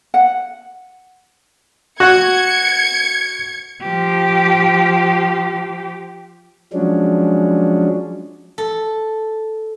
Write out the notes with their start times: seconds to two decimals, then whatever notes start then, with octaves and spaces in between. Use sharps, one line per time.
0.14 F#5
2.00 F#4 G#6 C#7
3.82 F3 G4
6.73 F3 F#3 G#3 C#4 D4
8.58 A4